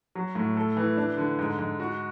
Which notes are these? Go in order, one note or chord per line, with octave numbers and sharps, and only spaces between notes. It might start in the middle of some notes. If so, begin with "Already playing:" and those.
F#3
A2
A4
E3
D4
D3
G#2
G#2
F#4